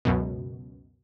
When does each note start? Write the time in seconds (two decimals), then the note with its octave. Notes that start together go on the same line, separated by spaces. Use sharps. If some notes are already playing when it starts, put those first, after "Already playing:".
0.05 C#2 F#2 B2